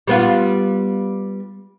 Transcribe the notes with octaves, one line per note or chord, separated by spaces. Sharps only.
G3 B3 F4